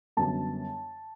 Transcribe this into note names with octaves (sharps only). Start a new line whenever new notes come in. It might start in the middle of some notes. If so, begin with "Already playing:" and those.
F#2 D3 G3 B3 A5